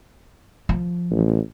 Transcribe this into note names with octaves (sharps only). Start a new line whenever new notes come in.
F3
A1